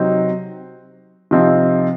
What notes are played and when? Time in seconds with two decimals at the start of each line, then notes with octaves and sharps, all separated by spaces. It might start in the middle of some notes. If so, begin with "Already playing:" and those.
Already playing: C3 F#3 C4 D#4
1.31 C3 F3 C4 D#4